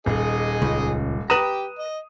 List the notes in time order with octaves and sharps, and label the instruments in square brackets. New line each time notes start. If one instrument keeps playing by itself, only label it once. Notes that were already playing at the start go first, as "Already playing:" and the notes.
[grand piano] D#1 [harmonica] D#4 G#4 D#5
[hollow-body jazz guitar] C#2
[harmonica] G4 G5 [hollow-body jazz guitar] B4 A#5 [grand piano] D#6 D#7 E7
[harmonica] D#5